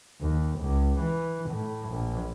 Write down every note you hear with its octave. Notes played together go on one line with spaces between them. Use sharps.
D#2
C#2
E3
A2
A#1